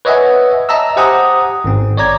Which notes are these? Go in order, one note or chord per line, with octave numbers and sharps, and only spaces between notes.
B4 C#5 D#5 E5 F#5 G#5
D#5 E5 A5 A#5 E6
G4 C5 F#5 G#5 A#5 D#6
G#1 C4
C#5 D5 A#5 G#6